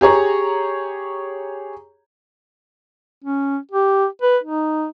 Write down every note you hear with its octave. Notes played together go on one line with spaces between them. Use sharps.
G4 G#4 C#5 A#5
C#4
G4
B4
D#4